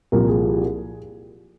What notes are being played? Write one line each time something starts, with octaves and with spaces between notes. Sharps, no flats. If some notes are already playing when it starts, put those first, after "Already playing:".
C2 A#2 F3 A#4
G#4